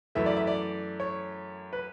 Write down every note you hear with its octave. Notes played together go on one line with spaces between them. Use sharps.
F#2 E3 A3 E5
D5
E5
D5
C#5
B4